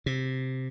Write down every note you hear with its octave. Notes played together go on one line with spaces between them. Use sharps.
C3